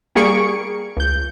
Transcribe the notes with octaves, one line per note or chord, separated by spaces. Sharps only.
G3 A#3 G#4 C#6 C#7 D7
C#2 G6